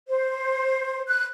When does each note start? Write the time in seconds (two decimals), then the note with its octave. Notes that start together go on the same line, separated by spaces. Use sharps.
0.08 C5
1.08 F#6